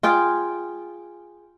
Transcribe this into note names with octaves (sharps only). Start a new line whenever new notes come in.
F4 G#4 G5